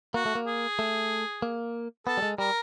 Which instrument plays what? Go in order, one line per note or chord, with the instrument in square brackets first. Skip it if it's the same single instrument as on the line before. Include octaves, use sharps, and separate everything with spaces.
[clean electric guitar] A#3 [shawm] F#4
[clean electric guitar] A3
A#3
[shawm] G#4
[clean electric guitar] A3
A#3
[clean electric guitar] B3 [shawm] A4
[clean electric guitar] G3
G#3
[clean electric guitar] G3 [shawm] A#4